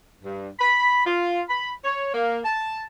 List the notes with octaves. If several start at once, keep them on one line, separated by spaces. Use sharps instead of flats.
G2
B5
F4
B5
C#5
A#3
A5